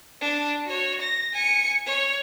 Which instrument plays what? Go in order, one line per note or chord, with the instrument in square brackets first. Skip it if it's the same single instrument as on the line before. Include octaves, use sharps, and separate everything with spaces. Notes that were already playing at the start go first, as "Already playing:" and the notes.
[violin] D4
F#4 C#5
A#6
G#5 C#7
C#5